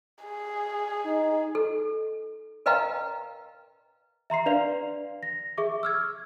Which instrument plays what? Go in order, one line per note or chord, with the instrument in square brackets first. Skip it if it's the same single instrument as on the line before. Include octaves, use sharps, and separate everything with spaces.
[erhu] G#4
[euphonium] D#4
[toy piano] A4
A#4 B4 D#5 F5 G5 A#5
[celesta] E5 A#5 C6 C7
D4 B4 D5 F5 F7
A#6
G#4 E5 C#6 D6
E6 F6 G#6